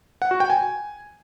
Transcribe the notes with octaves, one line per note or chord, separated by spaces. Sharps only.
F#5
F#4
G5
G#5